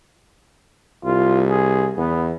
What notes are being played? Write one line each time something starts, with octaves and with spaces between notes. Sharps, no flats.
C2 F4
G#4
E2 B3